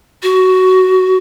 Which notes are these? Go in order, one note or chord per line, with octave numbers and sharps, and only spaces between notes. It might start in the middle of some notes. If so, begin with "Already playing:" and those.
F#4